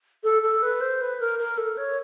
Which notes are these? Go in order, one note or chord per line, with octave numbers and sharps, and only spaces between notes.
A4
A4
B4
C5
B4
A#4
A#4
A4
C#5